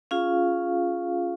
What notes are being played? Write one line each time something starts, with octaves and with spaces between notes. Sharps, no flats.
C#4 F4 G#4 F5